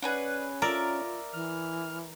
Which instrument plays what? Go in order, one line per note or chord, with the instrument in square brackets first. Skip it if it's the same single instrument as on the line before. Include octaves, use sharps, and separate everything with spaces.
[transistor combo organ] C#4 [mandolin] G#4 B4 F#5 [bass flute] D5
[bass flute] F4 [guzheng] A#4 D5 [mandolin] E5 A#5
[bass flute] E3 [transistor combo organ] F6